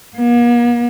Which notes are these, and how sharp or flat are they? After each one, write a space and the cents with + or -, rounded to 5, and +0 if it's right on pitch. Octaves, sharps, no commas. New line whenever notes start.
A#3 +45